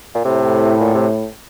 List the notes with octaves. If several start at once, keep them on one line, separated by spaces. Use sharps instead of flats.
A#2
A2 C3
A#2
C3